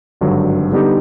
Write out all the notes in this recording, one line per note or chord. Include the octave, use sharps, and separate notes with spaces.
G#1 G2 D3 F#3
D3 G3 B3 D#4 G4